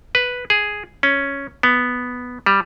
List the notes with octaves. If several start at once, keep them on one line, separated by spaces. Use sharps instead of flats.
B4
G#4
C#4
B3
G3